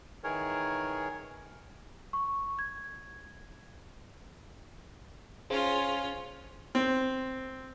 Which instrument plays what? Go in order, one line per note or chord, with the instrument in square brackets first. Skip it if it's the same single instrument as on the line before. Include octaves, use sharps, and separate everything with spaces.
[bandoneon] D#3 E3 G#4 A#4 C#5
[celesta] C#6
G#6
[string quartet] C#4 F4 [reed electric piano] G#4 C5 F5
[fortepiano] C4